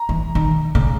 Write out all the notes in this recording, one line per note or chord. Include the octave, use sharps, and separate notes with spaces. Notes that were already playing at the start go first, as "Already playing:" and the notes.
Already playing: A#5
E3
D#3
C#3